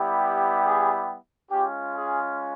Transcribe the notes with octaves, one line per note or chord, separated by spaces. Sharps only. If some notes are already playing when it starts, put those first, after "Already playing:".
Already playing: G3 B3 E4 G4
G#4
G#3 C#4 F4 G4
G#4